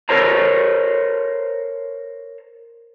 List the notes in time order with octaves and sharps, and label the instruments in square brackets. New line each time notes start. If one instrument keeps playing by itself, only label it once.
[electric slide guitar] A4 A#4 C5 C#5 A5 A#5